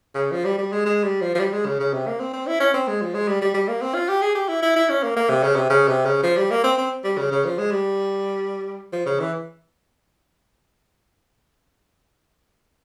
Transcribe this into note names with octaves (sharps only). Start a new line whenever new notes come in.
C#3
F3
G3
G3
G#3
G#3
G3
F3
F3
G3
G#3
C#3
C#3
C3
A#3
C4
C4
E4
C#4
C4
G#3
F3
G#3
G3
G3
G3
A#3
C4
F4
G4
G#4
G4
E4
E4
E4
C#4
A#3
A#3
C3
C#3
C3
C#3
C3
C#3
F3
G3
A#3
C4
C4
G3
C#3
C#3
F3
G#3
G3
F3
C#3
E3